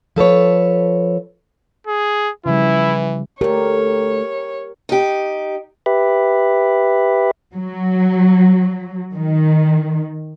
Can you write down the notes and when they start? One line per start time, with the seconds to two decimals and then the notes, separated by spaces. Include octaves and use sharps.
0.16 F3 A4 B4 C#5
1.87 G#4
2.46 C#3 E3 F3 G3 E4
3.41 D2 A3 G4 A#4 C#5
4.89 D#4 G4
5.86 G4 B4 E5
7.54 F#3
9.15 D#3